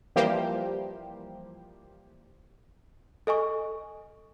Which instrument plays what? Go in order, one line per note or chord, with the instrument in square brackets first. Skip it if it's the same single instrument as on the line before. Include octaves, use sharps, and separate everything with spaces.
[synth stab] E3 F3 G3 A#3 G4 C5
[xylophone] A4 D#5 G#5 C#6